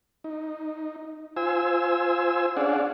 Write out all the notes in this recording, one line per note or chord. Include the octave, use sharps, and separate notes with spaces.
D#4
F4 C5 G#5 E6
C#4 D4 G#4 D5 F5 F#5